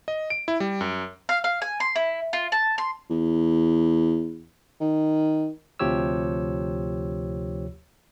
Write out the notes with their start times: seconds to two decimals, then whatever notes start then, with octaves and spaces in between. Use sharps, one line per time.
0.08 D#5
0.30 D7
0.48 E4
0.60 G3
0.81 F#2
1.29 F5
1.44 F5
1.62 G#5
1.80 C6
1.96 E4
2.33 F4
2.52 A5
2.78 C6
3.10 E2
4.81 D#3
5.79 D2 C3 F3 G4 C#5 E6